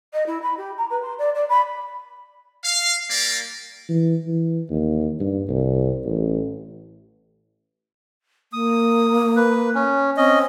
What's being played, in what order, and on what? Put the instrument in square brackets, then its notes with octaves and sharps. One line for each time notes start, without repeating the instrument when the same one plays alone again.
[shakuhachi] D#5
E4
B5
G4
A#5
B4
C6
D5
D5
B5
[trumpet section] F5
G3 A#3 G4 D5
[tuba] E3
E3
D#2
G2
C2
A1
[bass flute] A#3 [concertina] D#6
[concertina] B4
C#4
[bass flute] C4 [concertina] C#4 D#5